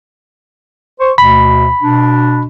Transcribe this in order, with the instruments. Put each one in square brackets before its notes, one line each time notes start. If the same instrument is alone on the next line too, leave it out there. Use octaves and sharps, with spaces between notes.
[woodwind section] C5 C#6
[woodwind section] D2 B2 [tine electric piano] B5
[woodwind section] B2 D4